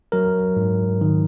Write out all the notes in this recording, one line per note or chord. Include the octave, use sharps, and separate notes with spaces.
F#3 A#4
G#2
D#3